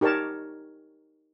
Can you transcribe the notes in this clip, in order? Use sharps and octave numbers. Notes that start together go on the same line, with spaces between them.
D#4 G4 A#4 C#5 A5